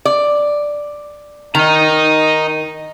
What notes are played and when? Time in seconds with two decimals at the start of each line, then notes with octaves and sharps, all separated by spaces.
0.05 D5
1.55 D#3 D#5 A#5